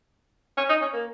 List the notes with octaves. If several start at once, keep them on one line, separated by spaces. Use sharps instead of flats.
C#4
D#4
C#4
A#3